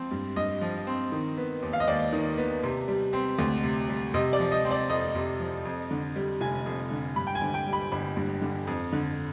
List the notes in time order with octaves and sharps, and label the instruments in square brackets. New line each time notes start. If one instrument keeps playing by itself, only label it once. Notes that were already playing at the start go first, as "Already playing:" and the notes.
Already playing: [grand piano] F3 C4
G2
G2 D#5
F3
C4
D#3
B3
D#2
F5
D#5
D#2 D5
D#3
B3
C3
G3
C4
D2
C3
G3
C3 D#5
D5
F3
D#5
C4
D5
F2 D#5
C3
F3
F2
D3
G3
F1 G#5
F2
D3
G2 B5
G5
G#5
D3
G5
G3
B5
G1 B5
G2
D3
F2
D3